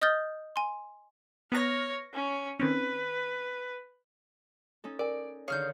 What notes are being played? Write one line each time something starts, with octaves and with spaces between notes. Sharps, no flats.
D#5 D#6 F6 G6 A6 G7
G#5 C6
B3 C#5 F6 A#6
C#4 C#5
D#3 C4 C#4 B4
C#4 D#4 A4
A#4 D5 G#5
D3 D#3 G#4 C#5 F5 F6 G6